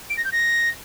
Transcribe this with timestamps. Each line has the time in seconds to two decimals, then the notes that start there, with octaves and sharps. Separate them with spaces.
0.10 D7
0.17 A#6
0.25 G6
0.32 A#6